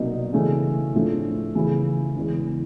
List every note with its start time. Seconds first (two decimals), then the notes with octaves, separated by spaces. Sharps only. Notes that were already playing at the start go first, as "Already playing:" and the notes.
Already playing: C2 B2 F#3 A#3 D#4
0.32 C#3 E3 A3 C#4
0.93 A2 F3 A3 D4
1.55 C#3 E3 A3 C#4 E4
2.15 E2 C#3 E3 G#3